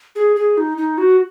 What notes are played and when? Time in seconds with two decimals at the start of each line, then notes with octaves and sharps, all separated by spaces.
0.15 G#4
0.36 G#4
0.58 D#4
0.78 D#4
0.98 F#4